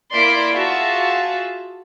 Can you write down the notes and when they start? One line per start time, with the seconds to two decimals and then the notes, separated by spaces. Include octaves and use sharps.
0.14 A#3 E4 D5 C6 B6 D7
0.53 F4 F#4 G#4 E5 A5